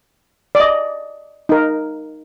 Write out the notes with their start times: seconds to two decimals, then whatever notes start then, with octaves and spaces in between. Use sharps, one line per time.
0.55 D5
0.60 D#5
1.49 D#4 A#4